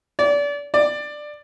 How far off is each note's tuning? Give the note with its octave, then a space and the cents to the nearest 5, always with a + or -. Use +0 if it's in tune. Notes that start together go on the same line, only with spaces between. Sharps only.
D5 -30
D5 +15